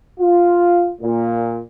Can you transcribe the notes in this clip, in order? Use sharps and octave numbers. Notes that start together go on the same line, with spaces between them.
F4
A#2